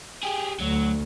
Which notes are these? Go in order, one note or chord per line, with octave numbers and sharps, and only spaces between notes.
G4 G#4
D2 F#3